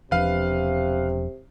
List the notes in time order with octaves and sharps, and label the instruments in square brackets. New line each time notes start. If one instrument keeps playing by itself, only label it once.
[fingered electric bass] E1 F3 D4 [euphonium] C3 [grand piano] B4 F5